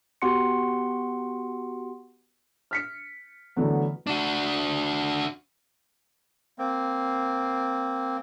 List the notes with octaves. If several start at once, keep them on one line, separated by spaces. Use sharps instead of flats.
B3 F#4 G4 F#5 C6 C#7
F6 B6 C#7
D3 E3 F#3 A3 B3
D4 F#4
A#3 C4